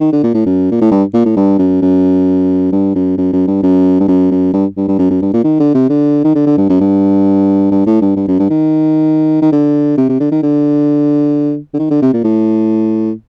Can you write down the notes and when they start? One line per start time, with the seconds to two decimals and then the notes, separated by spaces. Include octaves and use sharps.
0.01 D#3
0.13 D3
0.23 A#2
0.35 A2
0.46 F#2
0.71 A#2
0.81 A2
0.91 G2
1.14 A#2
1.26 A2
1.36 G2
1.59 F#2
1.82 F#2
2.72 G2
2.95 F#2
3.18 F#2
3.33 F#2
3.47 G2
3.63 F#2
4.00 G2
4.08 F#2
4.31 F#2
4.54 G2
4.77 G2
4.88 G2
4.99 F#2
5.10 F#2
5.22 G2
5.33 A#2
5.44 D#3
5.60 D3
5.74 C3
5.90 D3
6.24 D#3
6.35 D3
6.47 D3
6.58 G2
6.69 F#2
6.80 G2
7.71 G2
7.86 A2
8.02 G2
8.16 G2
8.28 F#2
8.39 G2
8.50 D#3
9.42 D#3
9.53 D3
9.98 C3
10.09 C3
10.20 D3
10.32 D#3
10.43 D3
11.74 D3
11.79 D#3
11.91 D3
12.02 C3
12.13 A#2
12.24 A2